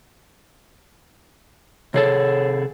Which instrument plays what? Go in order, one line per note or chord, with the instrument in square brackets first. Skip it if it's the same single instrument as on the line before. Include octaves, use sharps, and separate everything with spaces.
[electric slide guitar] C3 G#4 A4 [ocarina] C#5